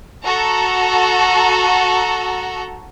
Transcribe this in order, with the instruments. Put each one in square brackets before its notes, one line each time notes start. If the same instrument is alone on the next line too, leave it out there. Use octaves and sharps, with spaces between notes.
[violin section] F#4 A4 A#5